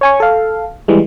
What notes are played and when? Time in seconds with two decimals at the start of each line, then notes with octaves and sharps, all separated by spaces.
0.01 C#5 G#5 C#6
0.20 A4 F5
0.88 E3 G3 G#3